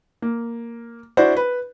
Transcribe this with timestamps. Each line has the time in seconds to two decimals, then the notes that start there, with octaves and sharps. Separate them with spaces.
0.22 A#3
1.17 D4 E4 F#4 C5 D5
1.36 B4